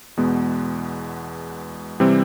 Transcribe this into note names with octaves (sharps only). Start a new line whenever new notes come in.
E2 B2 G#3 B3
C3 E3 G3 C4